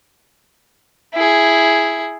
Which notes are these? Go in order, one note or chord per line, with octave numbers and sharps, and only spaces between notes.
E4 G#4